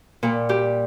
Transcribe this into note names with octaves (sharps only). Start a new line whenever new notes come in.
A#2 G3
G3 G4